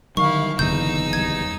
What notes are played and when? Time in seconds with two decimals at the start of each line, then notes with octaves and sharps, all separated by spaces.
0.17 D3 D#3 F#3 G3 E4 F5 C#6
0.59 F#1 E2 B2 D3 D#4 E6 G6
1.13 D#1 G3 G#6